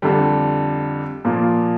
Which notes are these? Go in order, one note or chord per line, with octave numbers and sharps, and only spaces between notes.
F2 D3 G3
A#2 F3 A#3 F4